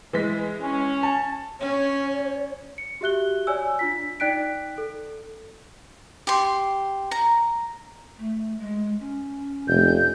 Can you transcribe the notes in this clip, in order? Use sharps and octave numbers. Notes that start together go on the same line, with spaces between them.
E3 G#3 B6
C#4
A5
C#4 C#5
C#7
F#4 G4 E5 F#6 G7
C#5 D5 G#5 E6
D4 F4 B6
D#4 D5 G5 F#6 B6 D7
A4
G4 C6
A#5
A3
G#3
C#4
F1 G6